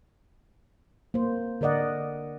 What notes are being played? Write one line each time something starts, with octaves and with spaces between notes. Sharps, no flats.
A#3 C5
D3 A#4 D5 D#5 F#5